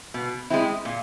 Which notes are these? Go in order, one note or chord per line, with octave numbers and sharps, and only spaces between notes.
B2
G#3 C4 E4
A#2